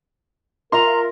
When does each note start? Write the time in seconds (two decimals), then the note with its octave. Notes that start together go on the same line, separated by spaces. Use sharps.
0.72 F4 A#4 E5 A#5 C6